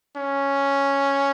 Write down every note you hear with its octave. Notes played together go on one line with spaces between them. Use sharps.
C#4